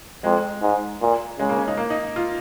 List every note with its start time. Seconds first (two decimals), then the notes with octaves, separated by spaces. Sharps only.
0.24 F2 G#3
0.62 G#2
1.01 A#2
1.39 C#3 G#3
1.49 A#3
1.58 C#4
1.68 D#4
1.77 A#3
1.90 D#4
2.16 F4